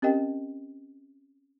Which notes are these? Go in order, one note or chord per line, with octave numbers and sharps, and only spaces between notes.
C4 C#4 G4 A#4 D#5 G5